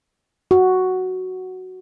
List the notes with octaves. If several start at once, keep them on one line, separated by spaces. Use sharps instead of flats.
F#4